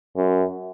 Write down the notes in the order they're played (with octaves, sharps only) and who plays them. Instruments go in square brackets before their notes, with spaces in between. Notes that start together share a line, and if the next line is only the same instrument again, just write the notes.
[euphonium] F#2